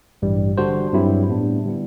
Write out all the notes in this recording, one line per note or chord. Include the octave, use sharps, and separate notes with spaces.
A1 G2 E3 G3
D3 G3 D4 F#4 C5
G2 F#3 C4 E4 G4
A2 G3 B3 D4
D3 G3 B3 E4